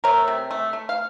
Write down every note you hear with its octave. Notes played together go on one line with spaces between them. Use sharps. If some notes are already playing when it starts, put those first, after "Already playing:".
A3 A#4 C#5
C3
A3
A3
F5